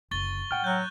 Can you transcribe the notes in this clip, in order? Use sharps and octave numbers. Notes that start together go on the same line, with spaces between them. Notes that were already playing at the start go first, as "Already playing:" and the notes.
F#1 D3 C#6 A6 G7
A2 F#5 G5 F6
F#3 F#6 G6